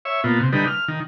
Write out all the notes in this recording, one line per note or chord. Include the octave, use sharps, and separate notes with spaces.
C#5 E5
A#2 B3 F4
C3
D3 G3 D#4 B4
F6
D#3